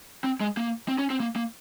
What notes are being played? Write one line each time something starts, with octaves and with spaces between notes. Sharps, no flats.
C4
G#3
A#3
C4
C#4
C4
A#3
A#3